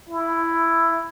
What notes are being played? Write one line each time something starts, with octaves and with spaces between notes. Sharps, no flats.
E4